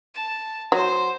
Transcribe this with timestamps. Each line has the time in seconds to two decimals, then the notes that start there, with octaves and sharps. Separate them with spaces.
0.14 A5
0.72 F#3 C5